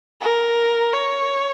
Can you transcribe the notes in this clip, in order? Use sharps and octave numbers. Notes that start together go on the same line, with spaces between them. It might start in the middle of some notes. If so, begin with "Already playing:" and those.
A#4
C#5